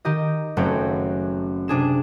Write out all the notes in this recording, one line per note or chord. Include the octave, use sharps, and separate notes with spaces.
D#3 G4 D#5
F#1 F#2 A3 C4 C#5 G5
C3 D4 G#4 E7